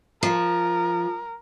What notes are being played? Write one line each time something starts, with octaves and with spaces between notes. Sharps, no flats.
F3 A#4